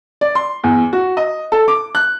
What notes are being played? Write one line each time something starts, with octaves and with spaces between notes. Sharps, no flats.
D5
C6
E2
F#4
D#5
A4
D6
F#6